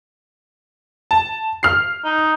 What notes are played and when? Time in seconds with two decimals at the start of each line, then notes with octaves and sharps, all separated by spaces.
1.11 A5
1.63 F6 C7
2.04 D#4